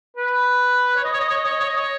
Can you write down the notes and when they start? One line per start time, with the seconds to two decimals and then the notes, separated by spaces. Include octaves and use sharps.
0.17 B4
0.96 C#5
1.04 D#5
1.13 C#5
1.21 D#5
1.29 C#5
1.37 D#5
1.45 C#5
1.53 D#5
1.60 C#5
1.69 D#5
1.77 C#5